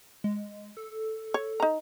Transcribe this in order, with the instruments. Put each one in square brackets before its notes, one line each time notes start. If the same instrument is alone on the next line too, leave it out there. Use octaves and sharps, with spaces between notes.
[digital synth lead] G#3
A4
[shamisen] C#5
D#4 A#5